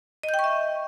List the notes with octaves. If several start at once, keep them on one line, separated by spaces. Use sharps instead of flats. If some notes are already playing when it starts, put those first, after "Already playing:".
D#5
G6
G5
C#6
E5